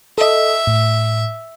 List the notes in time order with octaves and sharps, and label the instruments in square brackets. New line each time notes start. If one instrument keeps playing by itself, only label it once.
[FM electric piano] A4 D#5 [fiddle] E5
[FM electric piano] A2